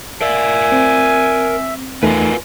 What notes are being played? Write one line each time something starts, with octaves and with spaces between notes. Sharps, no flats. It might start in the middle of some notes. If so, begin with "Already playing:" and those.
A#4 D5 E5 G#5
C4
E2 A3 D#4 F4 A#4 B4 G#5